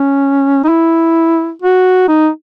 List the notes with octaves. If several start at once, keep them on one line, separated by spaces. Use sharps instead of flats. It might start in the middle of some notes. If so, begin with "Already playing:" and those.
Already playing: C#4
D#4
E4
F#4
D#4